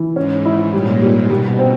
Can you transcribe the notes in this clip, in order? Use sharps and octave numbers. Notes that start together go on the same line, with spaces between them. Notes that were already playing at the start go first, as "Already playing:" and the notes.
Already playing: E3
G#2 C#4
E4
A#2 G3
G3
B2 G3
C4